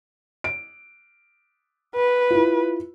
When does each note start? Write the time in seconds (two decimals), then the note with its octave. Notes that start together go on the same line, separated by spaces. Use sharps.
0.44 D7
1.96 B4
2.31 E4 F4